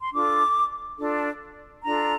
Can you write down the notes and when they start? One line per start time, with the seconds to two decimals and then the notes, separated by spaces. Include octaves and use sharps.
0.02 C6
0.12 D4 F4 A4 D6
0.98 D4 F4 A4
1.83 D4 F4 A4 A#5